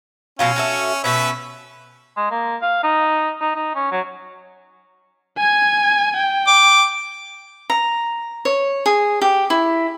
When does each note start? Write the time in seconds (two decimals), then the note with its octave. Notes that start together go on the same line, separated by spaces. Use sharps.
0.39 B2 F#3 C#4 F4
0.56 F#4 A4 E5
1.04 B2 C#4 B4 E5
2.17 G#3
2.31 A#3
2.62 F5
2.83 D#4
3.41 D#4
3.56 D#4
3.75 C#4
3.92 F#3
5.38 G#5 G#6
6.16 G5
6.47 D6
7.70 A#5
8.45 C#5
8.86 G#4
9.22 G4
9.50 E4